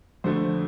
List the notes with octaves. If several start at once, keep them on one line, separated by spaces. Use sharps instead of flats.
F2 D3 A3 C5